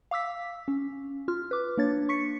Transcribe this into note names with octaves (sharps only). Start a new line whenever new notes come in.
F5 D6 E6 B6
C#4
F4 F6
B4 D6
A#3 D4 C#5 A6
C#6 B6 C#7